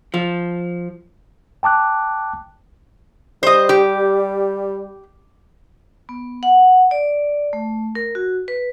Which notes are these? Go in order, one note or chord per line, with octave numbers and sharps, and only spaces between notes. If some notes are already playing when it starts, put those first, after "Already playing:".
F3
G5 A5 D6 F#6
G3 C5 D#5
G4
B3
F#5
D5
A3
A#4
F#4
B4